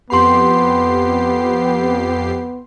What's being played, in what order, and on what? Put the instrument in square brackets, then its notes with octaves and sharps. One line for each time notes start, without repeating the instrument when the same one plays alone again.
[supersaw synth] F2 G4 C7 [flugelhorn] B3 [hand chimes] B5 C6